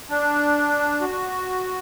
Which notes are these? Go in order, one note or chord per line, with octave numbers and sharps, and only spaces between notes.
D4
F#4